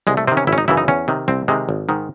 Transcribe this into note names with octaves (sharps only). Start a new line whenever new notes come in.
C2 G#3
A3
C3 D#3 C4
C#4
G#1 E4
C#4
D#4
F#2 C#3 E3 E4
D#4
E2 C#4
C3 D#3
C2 C4
C3 D#3 G#3
G#1
G#2 D#3